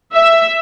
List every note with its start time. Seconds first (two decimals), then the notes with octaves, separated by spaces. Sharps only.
0.14 E5